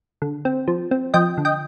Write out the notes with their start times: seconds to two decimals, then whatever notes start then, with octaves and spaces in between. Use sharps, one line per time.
0.22 D3
0.45 C4
0.68 F3
0.91 C4
1.14 F3 D#5 G5
1.38 D3
1.45 D#5 G5